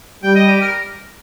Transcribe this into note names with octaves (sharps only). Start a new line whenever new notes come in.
G3 G5
D#5
G4
A#4